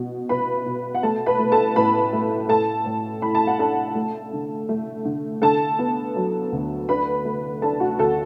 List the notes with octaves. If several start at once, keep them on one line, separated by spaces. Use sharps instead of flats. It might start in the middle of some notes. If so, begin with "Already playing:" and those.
Already playing: B2
B2 B4 B5
B2
F#5
A3 A4 A5
B4 B5
A3
A4 A5
A2 B4 B5
A3
A2 A4 A5
A2
A2 B5
A5
F#5
D4 A4 A5
A3
D3
A3
D3
D3 A4 A5
B3
F#3
D2
D4 B4 B5
A3
D4 A4 A5
F#4 F#5
D2 A4 A5